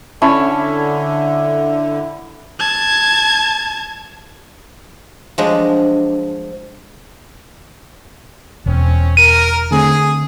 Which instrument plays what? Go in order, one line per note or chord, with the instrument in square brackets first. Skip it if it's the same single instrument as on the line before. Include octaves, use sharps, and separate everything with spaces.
[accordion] D3 [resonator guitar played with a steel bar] C#4 [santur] E4 [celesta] A5 C#6
[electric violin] A5 G#6
[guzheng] F3 F#3 G#3 D4
[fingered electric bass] E1 E2 [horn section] C4 C#4
[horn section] A#4 [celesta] D#7
[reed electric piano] D3 A3 C4 [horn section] G#4